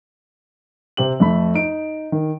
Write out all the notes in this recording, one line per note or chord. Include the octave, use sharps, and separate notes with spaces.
C3 C4 G4 F#7
F2 A3 B5
D#4 D7
D#3